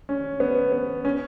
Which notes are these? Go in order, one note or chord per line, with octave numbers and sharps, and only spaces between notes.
C#4
B3
B3
C#4